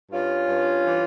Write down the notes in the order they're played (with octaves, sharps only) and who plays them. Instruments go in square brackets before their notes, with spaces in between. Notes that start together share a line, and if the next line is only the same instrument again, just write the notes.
[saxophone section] G2 C#4 F4
G2
E3